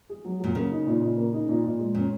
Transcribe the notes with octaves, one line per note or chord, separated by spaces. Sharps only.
G#4
F#3
A#2 F#3
C#3 A#3
D#4
A#2
A#2
A#3
D#4
A#2
A#2
G#3
A#2 C#4